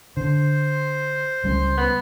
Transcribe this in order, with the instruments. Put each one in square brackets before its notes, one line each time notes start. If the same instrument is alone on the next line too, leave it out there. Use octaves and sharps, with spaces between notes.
[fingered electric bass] D3 [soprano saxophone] C5
[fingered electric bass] C#2 G3 C#4
[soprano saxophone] B3